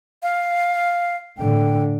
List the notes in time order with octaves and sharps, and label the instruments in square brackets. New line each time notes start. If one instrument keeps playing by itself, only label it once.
[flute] F5
[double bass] A2 D3 [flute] G5